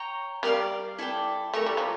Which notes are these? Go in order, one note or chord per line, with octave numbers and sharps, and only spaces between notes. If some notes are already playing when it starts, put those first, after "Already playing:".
Already playing: C#5 G5 A#5
G3 A#4 D5 F5
E4 A4 D5 G5
A3 A#4 C#5 E5 A#5
G3
F3